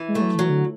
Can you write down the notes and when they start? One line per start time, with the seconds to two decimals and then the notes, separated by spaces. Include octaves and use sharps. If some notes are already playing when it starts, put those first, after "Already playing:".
Already playing: E3
0.08 G#3
0.15 A3
0.21 F#3
0.35 E3 F#3
0.49 D3